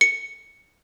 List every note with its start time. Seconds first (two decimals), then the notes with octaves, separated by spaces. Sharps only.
0.01 C#7